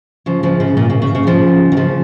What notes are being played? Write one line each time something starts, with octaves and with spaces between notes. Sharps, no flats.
C#3 F3
C#3 F3
C#3
A#2
C#3
C#3
C#3
C#3 F3
D#3
C#3 F3